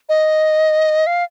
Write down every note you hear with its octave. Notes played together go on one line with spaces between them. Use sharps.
D#5
F5